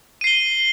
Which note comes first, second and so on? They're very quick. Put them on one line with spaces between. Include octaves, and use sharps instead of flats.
D#7 C7 G7